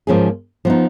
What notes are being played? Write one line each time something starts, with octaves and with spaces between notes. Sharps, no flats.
G#2 F3 A#3 C#4 G#4
F3 B3 D#4